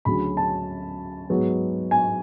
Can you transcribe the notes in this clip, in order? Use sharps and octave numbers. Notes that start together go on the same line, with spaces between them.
D2 C#3 F#3 C#4 B5
A5
G#2 F#3 B3
G#5